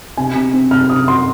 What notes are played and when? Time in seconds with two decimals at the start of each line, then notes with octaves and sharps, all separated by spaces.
0.17 C3 G#5
0.35 C3
0.53 C4
0.71 C3 F6
0.90 C3 D#6
1.07 F#4 C6